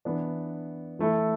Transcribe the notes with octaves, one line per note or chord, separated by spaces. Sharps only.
E3 B3 D4
E3 A3 E4 A4